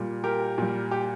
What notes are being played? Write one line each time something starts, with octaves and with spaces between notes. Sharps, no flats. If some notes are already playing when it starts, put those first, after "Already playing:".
Already playing: A#2 G3
G4 A#4
A#2 G3
G4